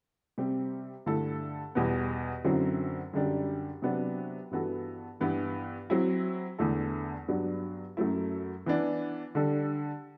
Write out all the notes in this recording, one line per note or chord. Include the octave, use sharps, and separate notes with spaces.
C3 G3 C4 G4
G2 D3 A3 E4 A4
E2 B2 G3 B3
F#2 D3 F#3 C4 E4
F#2 D3 G3 D4 G4
C3 F#3 B3 D4
G2 E3 B3 F#4 A4
G2 E3 B3
F#3 C4 E4
E2 D3 A3 E4 A4
G2 F#3 B3 D4
F#2 F#3 A3 E4
E3 B3 D4
D3 G3 D4 A4